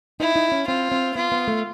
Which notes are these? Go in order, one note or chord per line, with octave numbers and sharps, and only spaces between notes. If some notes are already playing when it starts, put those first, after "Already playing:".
D#4 E4
D#4
C#4
C4 F4
C4
B3 F4
B3
A3